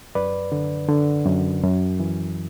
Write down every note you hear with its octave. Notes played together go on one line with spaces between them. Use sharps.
F#2 B4 D5
D3
D3
F#2
F#2
E3